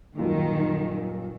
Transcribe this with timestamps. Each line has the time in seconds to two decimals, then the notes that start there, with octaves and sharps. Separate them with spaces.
0.17 D#1 F#2 A#2 D#3